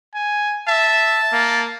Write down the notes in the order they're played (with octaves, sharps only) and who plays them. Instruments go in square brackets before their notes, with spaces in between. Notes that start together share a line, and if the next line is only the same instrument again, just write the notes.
[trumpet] G#5
[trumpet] E5 [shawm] A5
[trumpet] A#3